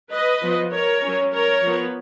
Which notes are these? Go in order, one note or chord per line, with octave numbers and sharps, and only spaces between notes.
B4 D#5
F3 B3
A#4 C#5
F#3 C#4
A#4 C#5
F3 B3